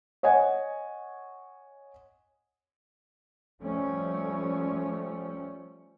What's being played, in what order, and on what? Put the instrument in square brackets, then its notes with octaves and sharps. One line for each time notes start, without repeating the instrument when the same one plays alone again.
[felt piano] C#5 D#5 F#5 G#5
[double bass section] F3 G3 A3 C#4